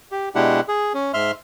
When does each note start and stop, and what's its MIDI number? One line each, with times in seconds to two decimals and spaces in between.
0.11 0.29 67
0.35 0.61 47
0.35 0.61 56
0.35 0.61 62
0.35 0.61 64
0.35 0.61 67
0.35 0.61 78
0.68 0.93 68
0.94 1.12 61
1.14 1.31 44
1.14 1.31 76
1.14 1.31 84
1.14 1.31 89